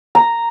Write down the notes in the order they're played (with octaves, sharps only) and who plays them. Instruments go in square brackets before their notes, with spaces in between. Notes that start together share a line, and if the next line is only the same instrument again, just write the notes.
[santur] A#5